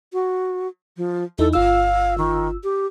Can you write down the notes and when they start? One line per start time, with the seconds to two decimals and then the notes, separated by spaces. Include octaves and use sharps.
0.13 F#4
0.97 F3
1.39 E2 D#4 E4 A4
1.53 G1 F4 F5 E6
2.18 D#3
2.64 G4